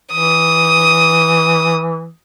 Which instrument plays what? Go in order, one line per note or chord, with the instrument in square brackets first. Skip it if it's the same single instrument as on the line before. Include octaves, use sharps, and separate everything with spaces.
[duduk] E3 [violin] D#6